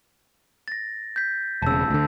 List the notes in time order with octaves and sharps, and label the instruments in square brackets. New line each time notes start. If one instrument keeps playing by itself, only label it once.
[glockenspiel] A6 A#6
G6 B6
[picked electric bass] E1 C#3 [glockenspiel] A5 E6
[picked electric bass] D2 D3